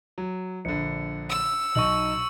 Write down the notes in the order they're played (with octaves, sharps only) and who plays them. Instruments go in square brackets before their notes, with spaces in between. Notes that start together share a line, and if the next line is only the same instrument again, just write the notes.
[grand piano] F#3
[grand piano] A#1 D3 [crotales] C#7
[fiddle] E6
[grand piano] B1 D#4 [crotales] C#6 F#7